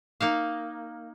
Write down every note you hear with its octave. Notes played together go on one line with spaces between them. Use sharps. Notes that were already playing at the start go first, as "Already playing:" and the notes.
A#3 D#4 F5